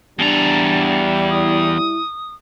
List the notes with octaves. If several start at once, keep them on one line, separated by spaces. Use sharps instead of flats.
E2 G3 D4 A5 A#5
E4 D#6